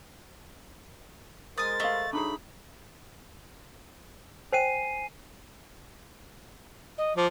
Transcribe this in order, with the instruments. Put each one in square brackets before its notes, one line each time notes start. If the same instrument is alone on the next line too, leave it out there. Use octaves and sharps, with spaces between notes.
[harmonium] G#3 A#4 C5 [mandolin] G#5 D#6 [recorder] A6
[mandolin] A3 [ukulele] D#5 F5
[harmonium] F#3 [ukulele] D4 D#4 G#4 [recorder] B5
[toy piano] C5 G5 [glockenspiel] G#5 C7 D#7
[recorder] D#5
[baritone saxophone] F3 [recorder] D6